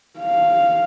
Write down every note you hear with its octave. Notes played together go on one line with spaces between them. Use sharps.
F5